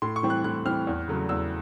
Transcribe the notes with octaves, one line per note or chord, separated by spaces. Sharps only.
A2 C6
C#6
E3 G3 C4
F#6
A2 F#6
E3 G3 C4 F6
E2
C#3 F#3 A3
E2 E6